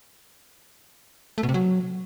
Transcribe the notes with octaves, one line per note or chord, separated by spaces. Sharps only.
A3
B2
C3
F#3